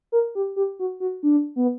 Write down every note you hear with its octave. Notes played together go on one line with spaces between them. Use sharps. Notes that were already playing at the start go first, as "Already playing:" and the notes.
A#4
G4
G4
F#4
F#4
D4
B3